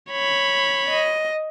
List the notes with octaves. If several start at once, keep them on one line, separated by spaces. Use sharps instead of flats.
C#5 B5
D#5